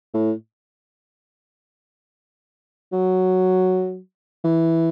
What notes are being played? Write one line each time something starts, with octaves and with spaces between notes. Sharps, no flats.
A2
F#3
E3